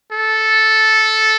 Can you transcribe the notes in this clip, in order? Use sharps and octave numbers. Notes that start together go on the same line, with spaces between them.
A4